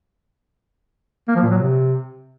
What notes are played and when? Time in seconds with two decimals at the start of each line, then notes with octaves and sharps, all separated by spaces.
1.28 A#3
1.35 F3
1.43 A#2
1.50 F#3
1.57 C3